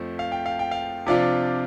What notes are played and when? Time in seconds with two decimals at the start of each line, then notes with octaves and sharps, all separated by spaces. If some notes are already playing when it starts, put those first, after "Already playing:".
Already playing: F2 F3 A3
0.19 F5
0.32 G5
0.46 F5
0.59 G5
0.71 F5
1.07 C3 F3 D4 F4 D5